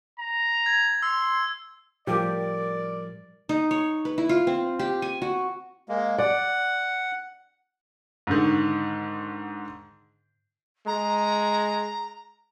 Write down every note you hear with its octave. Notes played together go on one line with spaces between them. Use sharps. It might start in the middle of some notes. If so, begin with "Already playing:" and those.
A#5
G#6
C6 E6
A2 F3 G3 G4 A#4 D5
D#4
C#5
B4
E4
F4
C4
G4
G#5
F#4
G#3 A#3
D5 F#5
G#2 D3 D#3
G#3 A#5